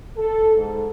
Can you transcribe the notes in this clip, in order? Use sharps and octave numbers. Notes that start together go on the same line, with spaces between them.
A4
G#2